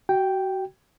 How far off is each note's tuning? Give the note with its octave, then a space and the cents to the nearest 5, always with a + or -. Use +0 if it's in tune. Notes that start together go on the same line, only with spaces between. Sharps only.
F#4 +30 G5 +0